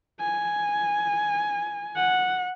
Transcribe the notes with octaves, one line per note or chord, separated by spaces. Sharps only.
G#5
F#5